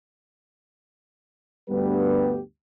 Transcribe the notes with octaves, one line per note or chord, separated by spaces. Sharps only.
D2 G2 G3 B3 G4 B4